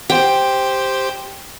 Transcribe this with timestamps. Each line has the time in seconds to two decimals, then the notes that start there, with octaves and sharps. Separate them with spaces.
0.10 G4 C5 G5